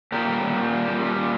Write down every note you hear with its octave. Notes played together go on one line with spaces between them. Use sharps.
A#2 G4 A#4
G3
A#2
A#2
G3
A#2
G3
A#2